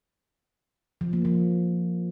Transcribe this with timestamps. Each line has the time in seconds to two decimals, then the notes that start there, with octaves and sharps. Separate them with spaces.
1.01 F3
1.13 A#3
1.25 F3